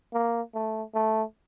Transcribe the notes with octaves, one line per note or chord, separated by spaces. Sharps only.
A#3
A3
A3